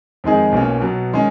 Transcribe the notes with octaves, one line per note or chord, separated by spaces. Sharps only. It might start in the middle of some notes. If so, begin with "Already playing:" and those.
F2 D#3 G#3 D#4 G#4
B1 B2 A#3 C#4
B2 F#3 B3
D#3 G#3 C#4